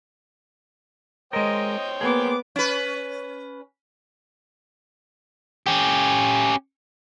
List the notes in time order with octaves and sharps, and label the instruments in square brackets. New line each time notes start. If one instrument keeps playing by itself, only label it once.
[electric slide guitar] G#3 A#4 [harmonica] C5 C#5 G5 [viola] D#5
[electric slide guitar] A#3 G#4 [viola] B3 D6
[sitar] C#4 B4
[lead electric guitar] C#4 G4